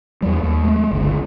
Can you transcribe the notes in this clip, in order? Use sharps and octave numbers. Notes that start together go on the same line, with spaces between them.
E2 G3
D#2
G#3 A3
G1 C#2 D3